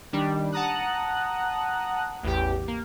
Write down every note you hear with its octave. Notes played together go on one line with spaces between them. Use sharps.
D#3 G3 D4
F#5 A5 A#5 D#6 F#6
A1 E2 G4
A#3